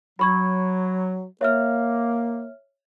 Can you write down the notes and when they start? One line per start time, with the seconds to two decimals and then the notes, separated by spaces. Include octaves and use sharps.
0.19 F#3 B5 C#6 G#6
1.41 A#3 C#5 E5 F6